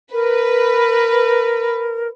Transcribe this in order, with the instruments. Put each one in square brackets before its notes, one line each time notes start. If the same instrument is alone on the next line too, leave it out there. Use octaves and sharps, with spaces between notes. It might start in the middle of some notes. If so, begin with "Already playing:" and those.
[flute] A#4 [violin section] B4